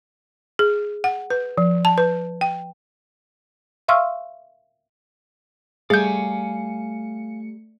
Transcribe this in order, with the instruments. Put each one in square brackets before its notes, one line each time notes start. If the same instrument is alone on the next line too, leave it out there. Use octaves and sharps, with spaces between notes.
[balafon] G#4
F#5
B4
F3
A5
B4
G5
[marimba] E5 F5 C6 C#6 E6 F6
[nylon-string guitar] G3 [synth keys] A3 C#7 [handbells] G#4 G6 [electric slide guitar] F5 G#5